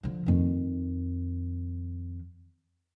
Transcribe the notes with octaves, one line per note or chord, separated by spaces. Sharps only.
D3 F3
F2 D#3